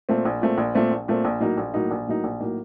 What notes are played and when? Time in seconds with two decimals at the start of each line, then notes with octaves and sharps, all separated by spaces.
0.09 A#2 A3 C4
0.25 A#1
0.42 A#2 A3 C4
0.58 A#1
0.75 A#2 A3 C4
0.91 A#1
1.08 A#2 A3 C4
1.25 A#1
1.40 A2 F#3 A#3 D#4
1.57 A#1
1.74 A2 F#3 A#3 D#4
1.91 A#1
2.07 A2 F#3 A#3 D#4
2.24 A#1
2.40 A2 F#3 A#3 D#4